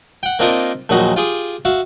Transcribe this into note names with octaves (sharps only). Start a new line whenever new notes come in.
F#5 G5
A#3 C4 D4 D#4 F4 A#4
A#1 D#2 A#2 F#3 D#4 F#4
F4 G4 G#4
F#4 E5 F5